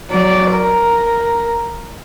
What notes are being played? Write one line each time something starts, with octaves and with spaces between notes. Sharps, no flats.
F#3 D5
A#4